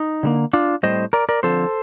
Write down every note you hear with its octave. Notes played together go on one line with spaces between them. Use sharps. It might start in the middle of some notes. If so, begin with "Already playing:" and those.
Already playing: D#4
D3 G3 A#3
D4 F4
A2 G3 C4 C5 D#5
A#4 D5
A#4 D5
D3 F3 C4 A4 C5